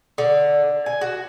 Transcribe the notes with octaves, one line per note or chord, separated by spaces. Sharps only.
D3
G#5
F#4